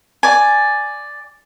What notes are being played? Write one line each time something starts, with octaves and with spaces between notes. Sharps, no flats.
D5 G#5